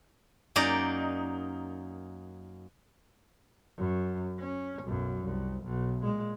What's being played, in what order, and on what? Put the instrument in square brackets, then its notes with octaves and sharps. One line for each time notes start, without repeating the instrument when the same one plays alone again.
[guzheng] F#2 A#3 D#4 D5 A#5
[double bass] F#2
C#4
B1 F#2
C2
B1
A#2 G#3